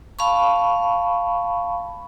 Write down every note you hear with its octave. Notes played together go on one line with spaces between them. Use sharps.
F5 A5 B5 C#6